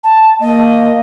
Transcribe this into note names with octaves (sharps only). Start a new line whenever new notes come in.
A5
A#3 D#5